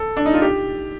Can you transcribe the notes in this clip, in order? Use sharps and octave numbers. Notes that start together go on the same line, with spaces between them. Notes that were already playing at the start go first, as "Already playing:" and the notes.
Already playing: A4
D4
D#4
F4
G4